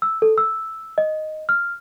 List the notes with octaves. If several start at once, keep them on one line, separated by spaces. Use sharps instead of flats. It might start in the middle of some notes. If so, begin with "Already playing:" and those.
E6
A4
E6
D#5
F6